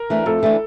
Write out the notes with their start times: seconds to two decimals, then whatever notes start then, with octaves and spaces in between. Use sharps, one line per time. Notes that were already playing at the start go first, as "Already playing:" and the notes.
Already playing: A#4
0.10 E3 A3 D4
0.26 F2 A4
0.43 E3 A3 D4